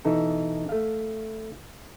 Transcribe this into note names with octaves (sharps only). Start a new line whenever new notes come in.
B2 E3 D#4 A4
A3 F5